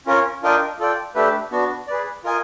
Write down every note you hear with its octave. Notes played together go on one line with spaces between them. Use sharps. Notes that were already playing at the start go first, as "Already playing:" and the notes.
C#4 F4 A#4 C#5
D4 F4 A#4 D#5 G5
F4 A4 D5 G5
A3 D4 G4 B4 E5
B3 D4 F#4
G#4 B4 D5
F4 A#4 D#5 G#5